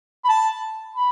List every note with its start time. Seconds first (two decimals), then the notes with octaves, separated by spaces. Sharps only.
0.24 B5
0.29 A5
0.96 B5